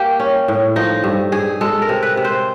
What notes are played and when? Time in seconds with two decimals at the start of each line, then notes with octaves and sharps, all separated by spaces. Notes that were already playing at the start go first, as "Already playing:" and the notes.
Already playing: A#3 G4
0.20 C#4
0.48 A2
0.76 F3 D#4
1.04 G2
1.32 G2 G#4
1.61 G#3 A4
1.82 A#4
1.89 C3
2.03 B4
2.17 C3
2.25 C5